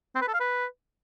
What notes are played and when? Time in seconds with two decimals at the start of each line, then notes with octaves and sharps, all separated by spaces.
0.15 C4
0.21 B4
0.28 A4
0.34 F5
0.40 B4